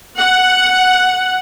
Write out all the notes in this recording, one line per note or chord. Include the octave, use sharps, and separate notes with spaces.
F#5